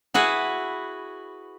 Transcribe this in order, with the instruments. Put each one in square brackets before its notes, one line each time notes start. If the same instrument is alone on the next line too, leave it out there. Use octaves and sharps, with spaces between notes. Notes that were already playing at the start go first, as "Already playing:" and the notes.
[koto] E4 F#4 G#4 B4